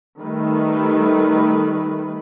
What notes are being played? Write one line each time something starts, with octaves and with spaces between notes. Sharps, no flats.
D#3 G3 A3 B4